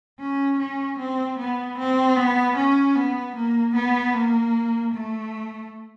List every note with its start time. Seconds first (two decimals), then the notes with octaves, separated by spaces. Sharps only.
0.20 C#4
0.59 C#4
0.99 C4
1.39 B3
1.78 C4
2.16 B3
2.57 C#4
2.95 B3
3.35 A#3
3.76 B3
4.14 A#3
4.94 A3